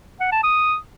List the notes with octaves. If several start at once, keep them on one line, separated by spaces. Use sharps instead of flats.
F#5
A5
D#6